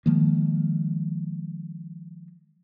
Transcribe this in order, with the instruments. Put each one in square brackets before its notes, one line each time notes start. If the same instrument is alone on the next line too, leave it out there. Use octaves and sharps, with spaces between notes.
[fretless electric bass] D#3 F3 G#3 A#3